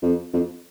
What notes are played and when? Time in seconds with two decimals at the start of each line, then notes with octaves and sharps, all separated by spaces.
0.02 F2
0.34 F2